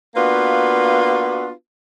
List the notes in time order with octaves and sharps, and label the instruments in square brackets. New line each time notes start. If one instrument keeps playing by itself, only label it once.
[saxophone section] A#3 B3 D4 F4 F#4 B4